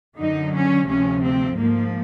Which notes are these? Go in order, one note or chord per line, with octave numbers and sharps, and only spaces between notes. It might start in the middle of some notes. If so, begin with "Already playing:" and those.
F#2 D3 F#3 D#4
C#4
D2 C3 F3 C#4
C4
G#2 F3 A#3